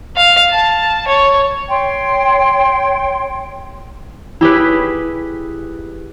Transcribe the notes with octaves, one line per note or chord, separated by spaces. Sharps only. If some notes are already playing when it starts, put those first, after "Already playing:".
F5
A5
C#5
C#5 G5 C6
E4 G4 G#4 B4